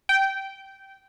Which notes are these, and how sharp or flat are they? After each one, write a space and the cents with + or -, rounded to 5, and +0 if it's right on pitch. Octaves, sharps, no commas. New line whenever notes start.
G5 -15